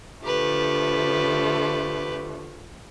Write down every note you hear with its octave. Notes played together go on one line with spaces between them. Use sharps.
D3 F3 A3 G4 B4